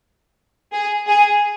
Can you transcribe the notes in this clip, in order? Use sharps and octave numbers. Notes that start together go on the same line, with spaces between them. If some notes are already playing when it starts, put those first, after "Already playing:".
G#4
G#4